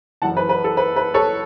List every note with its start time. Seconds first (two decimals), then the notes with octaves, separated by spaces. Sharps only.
0.22 F#1 F#2 E3 F#5 A5
0.37 B4
0.49 B4
0.64 A4
0.77 B4
0.96 B4
1.14 A4 C#5